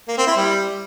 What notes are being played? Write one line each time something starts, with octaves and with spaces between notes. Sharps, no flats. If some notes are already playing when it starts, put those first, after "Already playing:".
A#3
C4
E4
G3